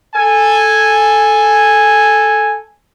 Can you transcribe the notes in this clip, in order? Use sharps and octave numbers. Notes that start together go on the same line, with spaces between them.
A4 G#5